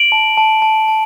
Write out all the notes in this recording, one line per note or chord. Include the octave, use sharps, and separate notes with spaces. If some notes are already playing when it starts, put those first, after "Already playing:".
Already playing: D7 F#7
A5
A5
A5
A5